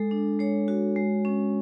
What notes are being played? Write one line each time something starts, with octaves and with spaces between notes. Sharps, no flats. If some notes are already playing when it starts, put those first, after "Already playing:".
Already playing: G#3 A4
D4
G#3 C#5
F#4
G#3
C#4